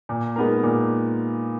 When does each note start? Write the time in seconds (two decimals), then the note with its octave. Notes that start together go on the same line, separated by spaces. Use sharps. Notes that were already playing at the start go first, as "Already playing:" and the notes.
0.09 A#2
0.36 G#3 B3 D#4 A#4
0.63 A#2